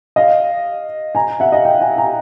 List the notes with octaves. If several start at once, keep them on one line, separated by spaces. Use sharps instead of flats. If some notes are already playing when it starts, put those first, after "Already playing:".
D#5 F5
G#5 A#5
E5 F#5
D#5 F5
F5 G5
F#5 G#5
G#5 A#5